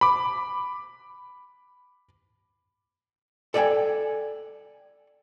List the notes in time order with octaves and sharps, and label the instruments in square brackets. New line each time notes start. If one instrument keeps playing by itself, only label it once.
[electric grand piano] B5 D6
[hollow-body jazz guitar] A4 D5 D#5 F5 G5 G#5